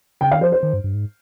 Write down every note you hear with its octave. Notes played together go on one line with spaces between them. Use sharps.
C#3 G5
D#3 F5
F3 C5
C5
D#3
G2
G2
G#2